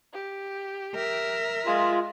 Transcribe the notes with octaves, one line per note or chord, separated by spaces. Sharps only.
G4
A#4 E5
G#3 F4